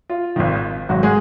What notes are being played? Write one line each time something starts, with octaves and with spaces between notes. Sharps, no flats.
F4
G#1 G#2 D#3
G#1 G#2 D#3 F#3 F#4
G#3 G#4